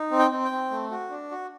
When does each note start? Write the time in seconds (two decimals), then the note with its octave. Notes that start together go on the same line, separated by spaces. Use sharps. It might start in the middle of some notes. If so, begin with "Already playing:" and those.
Already playing: D#4
0.11 C4
0.19 G5
0.32 C4
0.45 G5
0.52 C4
0.71 A3
0.91 F#4
1.10 D4
1.31 F#4